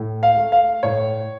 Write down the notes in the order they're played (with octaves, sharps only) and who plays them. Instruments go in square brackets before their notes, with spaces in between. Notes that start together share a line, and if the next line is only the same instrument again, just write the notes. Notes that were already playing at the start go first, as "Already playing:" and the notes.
Already playing: [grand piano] A2
F5
A3
F5
A2 C#5